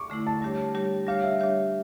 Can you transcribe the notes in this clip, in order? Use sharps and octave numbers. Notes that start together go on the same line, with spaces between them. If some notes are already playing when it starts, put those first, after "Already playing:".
Already playing: C#6 D6
D3 A3 E4
A5
G3 D4 G4 C#5
G3 D4 G4 C#5
G3 D4 G4 C#5 F5
E5
G3 D4 G4 C#5